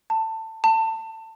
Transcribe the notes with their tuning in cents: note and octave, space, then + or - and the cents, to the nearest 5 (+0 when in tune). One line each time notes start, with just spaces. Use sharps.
A5 +20
A5 +25